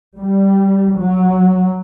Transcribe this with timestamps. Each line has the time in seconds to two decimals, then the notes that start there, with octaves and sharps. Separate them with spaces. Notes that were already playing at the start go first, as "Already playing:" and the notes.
0.17 G3
0.97 F#3